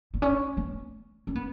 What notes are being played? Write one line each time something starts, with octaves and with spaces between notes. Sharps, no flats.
B3
C#4
B3
C#4
B3